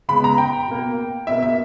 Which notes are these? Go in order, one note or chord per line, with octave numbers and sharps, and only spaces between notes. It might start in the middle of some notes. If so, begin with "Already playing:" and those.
C#3 G#3 B3 B5
A#5
G5
B2 A#3
B2 A#3 E5
E5